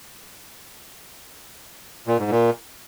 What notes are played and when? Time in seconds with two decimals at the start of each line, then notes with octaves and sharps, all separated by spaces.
2.07 A#2
2.19 G#2
2.30 A#2